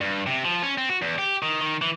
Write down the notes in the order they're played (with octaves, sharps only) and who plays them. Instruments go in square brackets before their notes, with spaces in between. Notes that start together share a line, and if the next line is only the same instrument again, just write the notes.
[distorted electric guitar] G2
C3
F3
C#4
C4
F#4
E2
G4
D#3
D#3
E3